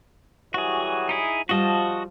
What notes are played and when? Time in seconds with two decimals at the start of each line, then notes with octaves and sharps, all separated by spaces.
0.54 E3 F#3 G3 F#4 G#4
1.09 D#4 E4 G#4
1.49 F3 G3 F4 F#4 D#5 A5